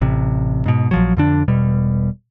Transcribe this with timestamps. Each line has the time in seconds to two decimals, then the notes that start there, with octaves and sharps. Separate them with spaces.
0.02 A1 C3
0.66 G#2 B2
0.91 A#1 F3 F#3
1.17 F2 D3 D4
1.48 E1 B2 G3